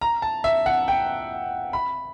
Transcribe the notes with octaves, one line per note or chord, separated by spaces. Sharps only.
A#5
A5
E5
F#5
G5
B5